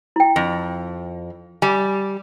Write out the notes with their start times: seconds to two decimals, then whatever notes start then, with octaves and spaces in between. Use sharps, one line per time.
0.16 E4 G5
0.36 F2
1.62 G3 G#5